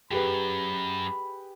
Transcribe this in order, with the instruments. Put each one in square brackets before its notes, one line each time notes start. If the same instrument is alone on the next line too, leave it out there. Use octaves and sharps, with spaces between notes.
[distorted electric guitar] F#2 [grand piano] G4 G#4 B4 [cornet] B5